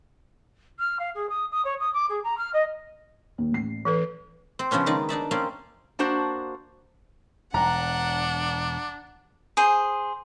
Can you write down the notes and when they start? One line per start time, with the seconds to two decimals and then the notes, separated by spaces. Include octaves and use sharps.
0.78 F6
0.99 F5
1.15 G#4
1.29 D#6
1.51 D#6
1.64 C#5
1.79 D#6
1.93 D6
2.09 G#4
2.23 A#5
2.37 F6
2.53 D#5
3.38 D#2
3.52 A1 C7
3.85 E3 A4 B4
4.59 C4
4.71 C#3 F3 B3 C#4 D4
4.86 D#3 G#3 D#4 D5
5.09 D4 D#4 D5 E5
5.31 A#3 C4 C#4 D5 F5
5.99 A#3 D4 F#4 C5 A5
7.54 E1 D4 F#5 A#5
9.57 G#4 C5